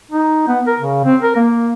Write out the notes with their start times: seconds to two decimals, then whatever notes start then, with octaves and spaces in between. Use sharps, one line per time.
0.12 D#4
0.48 B3
0.67 A#4
0.80 C#3
1.05 C4
1.22 A#4
1.36 A#3